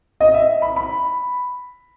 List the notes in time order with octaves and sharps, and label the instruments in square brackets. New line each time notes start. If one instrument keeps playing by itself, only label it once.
[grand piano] D#5
E5
B5
B5